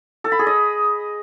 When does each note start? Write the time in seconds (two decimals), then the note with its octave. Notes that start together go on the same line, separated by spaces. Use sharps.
0.24 A4
0.32 B5
0.39 G#4
0.47 D#5